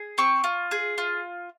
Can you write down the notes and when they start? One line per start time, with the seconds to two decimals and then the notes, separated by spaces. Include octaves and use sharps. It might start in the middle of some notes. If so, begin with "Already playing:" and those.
Already playing: G#4
0.18 C4 C#6
0.44 F4
0.71 G#4
0.98 F4